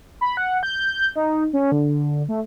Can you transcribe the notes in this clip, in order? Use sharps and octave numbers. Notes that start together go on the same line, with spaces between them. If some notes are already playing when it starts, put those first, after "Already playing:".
B5
F#5
G6
D#4
C#4
D3
A3